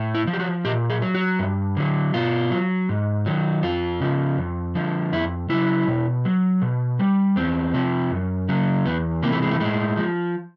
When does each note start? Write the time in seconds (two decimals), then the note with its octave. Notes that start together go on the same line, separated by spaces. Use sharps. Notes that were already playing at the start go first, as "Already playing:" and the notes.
Already playing: A2
0.15 E4
0.27 F3
0.33 G4
0.40 F#4
0.64 A#2 G4
0.90 G#4
1.02 F#3
1.14 F#4
1.39 G2
1.77 D3 F#3
2.14 B2 F4
2.51 F#3
2.89 G#2
3.26 D#3 F#3
3.63 F2 F4
4.01 C#3 F3
4.37 F2
4.75 D3 F3
5.12 F2 E4
5.49 C#3 F#3 E4
5.88 B2
6.25 F#3
6.62 B2
6.99 G3
7.36 E2 C4
7.74 C3 F3
8.11 F#2
8.49 C#3 F#3
8.85 E2 B3
9.23 C3 E3 A#3
9.32 A3
9.42 G#3
9.51 A3
9.60 A2 G#3
9.97 F3